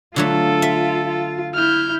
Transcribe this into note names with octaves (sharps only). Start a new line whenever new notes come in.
D3 F#3 A3 F4 A4
E5
F4
E4 F6 G6